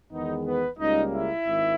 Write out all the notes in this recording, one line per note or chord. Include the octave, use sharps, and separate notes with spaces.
E2 D#3 G#3 B3 D#4
B3 B4
C#2 C#3 G3 A#3 D#4 D#5
E4 E5
G#1 G#2 D#3